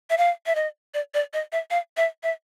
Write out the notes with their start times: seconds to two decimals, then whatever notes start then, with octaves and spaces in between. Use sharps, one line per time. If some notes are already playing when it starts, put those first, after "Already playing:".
0.10 E5
0.18 F5
0.46 E5
0.55 D#5
0.94 D5
1.14 D5
1.33 D#5
1.52 E5
1.71 F5
1.97 E5
2.23 E5